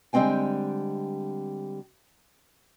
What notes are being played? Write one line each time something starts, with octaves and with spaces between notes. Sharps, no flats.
D3 G3 G#3 C4 G5 G#5